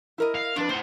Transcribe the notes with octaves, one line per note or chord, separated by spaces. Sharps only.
E4 A#4 D#5
F5
F2 D4 B4
A2 C5 F#5